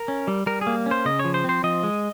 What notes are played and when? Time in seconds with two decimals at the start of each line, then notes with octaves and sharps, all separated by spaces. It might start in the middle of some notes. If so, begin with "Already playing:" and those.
Already playing: A#4
0.08 C#4
0.28 G3
0.46 G3 A#4
0.61 G#4
0.67 A#3
0.86 C#4
0.91 C5
1.05 C#3 D#5
1.19 F3 C#5
1.34 C5
1.44 C4 C5
1.63 F3 D#5
1.83 G#3